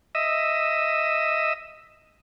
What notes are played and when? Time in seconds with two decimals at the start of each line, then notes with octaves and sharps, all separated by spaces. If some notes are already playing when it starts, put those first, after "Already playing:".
0.15 D#5 E5